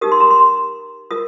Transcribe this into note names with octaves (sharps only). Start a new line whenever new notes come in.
D#4 G4 A#4 D#6
C6
A#5
C6
F4 A#4 D#6